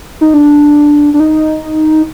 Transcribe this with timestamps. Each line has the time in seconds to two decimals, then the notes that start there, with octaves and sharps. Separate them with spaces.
0.21 D#4
0.34 D4
1.14 D4
1.20 D#4